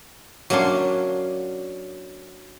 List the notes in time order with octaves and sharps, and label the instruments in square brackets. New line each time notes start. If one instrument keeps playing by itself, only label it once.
[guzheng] F#3 A#3 C#4 D4 C6